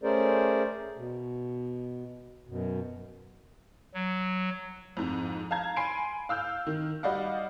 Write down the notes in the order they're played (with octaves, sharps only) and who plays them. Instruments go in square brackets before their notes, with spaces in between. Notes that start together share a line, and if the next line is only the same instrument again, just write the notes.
[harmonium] A3 C#4 G#4 A#4 C5 D5
B2
F#2 B2
[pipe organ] F#3
[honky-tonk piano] F2 G#2
F5 A5 A#5 G#6
G#5 B5 C6 C7 D7
F5 E6 F6 G6
D#3
G3 F#4 D5 D#5 F5 F#5